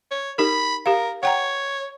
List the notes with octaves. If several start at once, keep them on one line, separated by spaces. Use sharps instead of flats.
C#5
D#4 G4 A#4 B5
G4 A#4 F5
C#5 F#5 G5 A#5